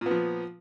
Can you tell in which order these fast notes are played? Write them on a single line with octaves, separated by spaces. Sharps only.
A#2 B3 F3